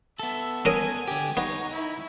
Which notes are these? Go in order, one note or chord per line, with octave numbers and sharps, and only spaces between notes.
B3 A4 E5
C#4 A#4 G#5 D#6
D3 G4 G#5
B3 D#4 C#5
E4